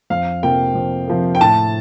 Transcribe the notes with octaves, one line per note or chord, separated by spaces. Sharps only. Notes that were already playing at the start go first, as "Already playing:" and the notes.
F2 F5
C3 F3 A#3 G5
F2
C3 F3 A#3
G5
A2 A5